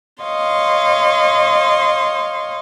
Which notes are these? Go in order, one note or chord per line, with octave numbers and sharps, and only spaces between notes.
C#5 D#5 F5 C6